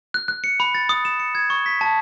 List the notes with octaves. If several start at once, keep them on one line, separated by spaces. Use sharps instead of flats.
F#6
F#6
C#7
B5
A6
D#6
E7
C#7
G#6
C#6
B6
A5